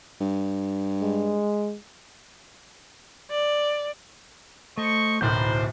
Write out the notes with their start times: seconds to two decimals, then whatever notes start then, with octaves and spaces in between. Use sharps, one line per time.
0.21 G2
1.02 G#3
3.31 D5
4.78 A3 C5 D#5 C#6
5.21 D1 B1 A2 A#4 C5 B5 G6